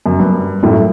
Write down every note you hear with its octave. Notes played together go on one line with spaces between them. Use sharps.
F#2
G2
F#2 A2